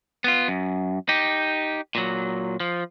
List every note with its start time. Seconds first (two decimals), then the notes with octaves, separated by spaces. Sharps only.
0.24 B3 F4
0.48 F#2
1.09 D#4 G4
1.95 A#2 F#3
2.60 F3